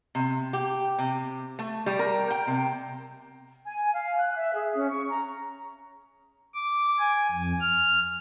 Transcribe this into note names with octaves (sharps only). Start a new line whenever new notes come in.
C3
G4
C3
A3
G3
A#4
G5
C3
G#5
F5
F#6
E5
G#4
C#4
C#6
A#5
D6
G#5
F2
F6